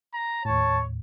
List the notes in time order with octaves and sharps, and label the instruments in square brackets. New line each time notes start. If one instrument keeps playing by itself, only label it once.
[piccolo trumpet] A#5
[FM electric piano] D#2 A2 [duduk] C#5 [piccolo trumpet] A5